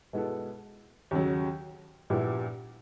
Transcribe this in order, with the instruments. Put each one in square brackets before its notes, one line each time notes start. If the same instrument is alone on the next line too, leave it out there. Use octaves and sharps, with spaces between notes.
[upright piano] B2 G#3 B3 E4 A4
D#2 C#3 F#3
A#1 A#2 G3 B3 E4